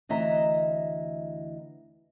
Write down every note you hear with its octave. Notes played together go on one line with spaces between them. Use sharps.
D2 E3 D#5 E5 A#5